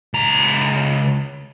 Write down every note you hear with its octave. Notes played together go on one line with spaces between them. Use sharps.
C#2 A#5